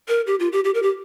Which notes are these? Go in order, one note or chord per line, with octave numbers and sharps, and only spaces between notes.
A#4
G4
F4
G4
G4
A#4
G4